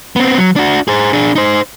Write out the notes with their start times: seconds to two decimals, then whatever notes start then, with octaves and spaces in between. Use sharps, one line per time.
0.16 B3 C4
0.38 F#3
0.56 D4 F#4
0.88 G#4 C5
1.13 D4 G#4
1.35 D#4 C5